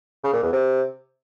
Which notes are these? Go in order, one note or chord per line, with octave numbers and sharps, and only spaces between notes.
C#3
A#2
E2
C3